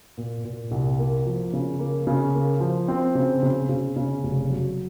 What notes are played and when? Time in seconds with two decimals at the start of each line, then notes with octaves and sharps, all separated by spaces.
0.18 A#2
0.45 A#2
0.71 C2
0.99 A#3
1.26 F3
1.53 C#3
1.79 A#3
2.07 C#3
2.35 A#3
2.60 F3
2.88 C4
3.15 C#3
3.43 C#3
3.69 C#3
3.96 C#3
4.23 F1
4.50 F#3